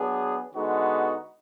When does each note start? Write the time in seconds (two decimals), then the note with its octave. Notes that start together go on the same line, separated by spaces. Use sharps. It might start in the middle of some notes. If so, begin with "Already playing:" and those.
Already playing: F#3 B3 D4 G#4
0.54 D3 G#3 B3 D#4 F#4